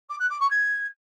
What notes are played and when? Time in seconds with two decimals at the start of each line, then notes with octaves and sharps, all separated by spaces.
0.09 D6
0.19 F#6
0.30 D6
0.40 C#6
0.50 G#6